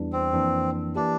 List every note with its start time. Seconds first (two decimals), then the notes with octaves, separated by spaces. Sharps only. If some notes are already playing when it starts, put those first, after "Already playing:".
Already playing: E2 E3 G3 D4
0.13 C4
0.33 F2 E3 A#3 D4
0.95 E3 A#3 D4 E4 G4